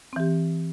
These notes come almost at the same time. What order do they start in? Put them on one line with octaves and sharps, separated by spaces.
C4 E3 G4